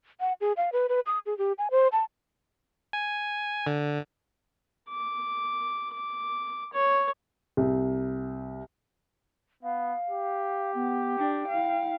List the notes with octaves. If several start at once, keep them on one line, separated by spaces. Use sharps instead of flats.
F#5
G#4
F5
B4
B4
D#6
G#4
G4
G#5
C5
A5
G#5
D3
D6
D6
C#5
C2
B3 F5
G4
B3
D4 G5
E4 F5